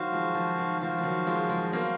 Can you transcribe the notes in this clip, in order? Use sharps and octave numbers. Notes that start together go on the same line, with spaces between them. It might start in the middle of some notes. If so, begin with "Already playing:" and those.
Already playing: D#3 F#3 F#4 C5 F5
F3 G#3
F3
D#3
F3 F#4 C5 F5
F3
D#3 F#3
F3 G#3
F3 G#3
F#3 A#3 F#4 C5 F5